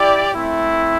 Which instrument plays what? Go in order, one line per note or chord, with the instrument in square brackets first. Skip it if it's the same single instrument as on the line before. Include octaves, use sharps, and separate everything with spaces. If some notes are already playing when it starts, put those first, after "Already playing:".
Already playing: [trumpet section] E4 G4 D5 G5
A3 C4 E4